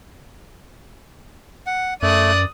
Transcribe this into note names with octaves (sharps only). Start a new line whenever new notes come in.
F#5
F#2 A3 D5 D#6 F#6